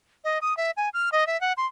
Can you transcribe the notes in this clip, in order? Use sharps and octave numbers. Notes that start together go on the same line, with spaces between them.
D#5
D#6
E5
G#5
F6
D#5
E5
F#5
C6